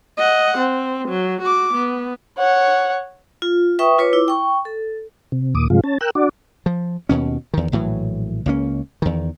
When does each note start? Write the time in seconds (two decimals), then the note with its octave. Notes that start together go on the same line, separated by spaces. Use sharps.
0.17 D#5 F#5
0.58 C4
1.08 F#3
1.42 F#4 D6
1.74 B3
2.39 C#5 F#5
3.42 F4
3.79 B4 E5 G5 C#6 D#6
3.98 F4 B4 C#5 D6
4.13 E4 D6
4.28 G5 C#6
4.65 A4
5.32 C3
5.55 D#2 A#2 D6 D#6
5.70 G2 C3 F3 G#3 F4
5.84 C#4 A5
6.01 A#4 G5 E6 F#6
6.15 D4 F#4 D5
6.66 F3
7.09 D#2 B2 C#4
7.54 E2 D#3
7.72 A#1 A2 E3 F#3
8.46 C#2 A#3 C#4
9.02 E2 D#3